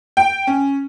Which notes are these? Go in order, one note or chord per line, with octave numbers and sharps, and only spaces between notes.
G5
C#4